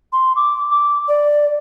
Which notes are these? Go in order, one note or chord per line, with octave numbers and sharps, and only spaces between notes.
C6
D6
D6
D5